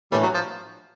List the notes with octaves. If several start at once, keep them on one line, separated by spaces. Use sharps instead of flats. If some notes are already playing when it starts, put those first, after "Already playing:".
A2 E3 G3 A3 D4
F#3
F3